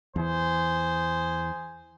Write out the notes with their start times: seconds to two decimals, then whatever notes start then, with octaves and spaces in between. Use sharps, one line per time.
0.16 E2 E3 G#4 C5